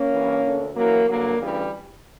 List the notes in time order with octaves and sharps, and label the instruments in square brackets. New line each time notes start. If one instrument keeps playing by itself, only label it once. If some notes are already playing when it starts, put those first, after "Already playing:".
Already playing: [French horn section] A#3 C#4
G2 E3
D2 D3
F#2 E3 F#3 A#3
G2 D3 F#3 A#3
D2 C#3 E3 G3